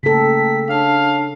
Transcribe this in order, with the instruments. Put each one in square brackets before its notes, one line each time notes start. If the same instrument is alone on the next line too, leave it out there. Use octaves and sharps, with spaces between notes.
[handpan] C#3 A4 [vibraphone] A3 A#3 G5 [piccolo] B6
[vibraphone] D4 C#5 A5 [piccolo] F5